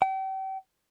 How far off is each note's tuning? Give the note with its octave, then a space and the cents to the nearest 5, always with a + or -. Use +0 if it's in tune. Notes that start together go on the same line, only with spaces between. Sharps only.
G5 -35